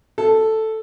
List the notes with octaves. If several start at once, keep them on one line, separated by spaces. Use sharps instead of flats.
A4